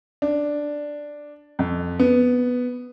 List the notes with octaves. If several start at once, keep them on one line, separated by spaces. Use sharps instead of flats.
D4
F2
B3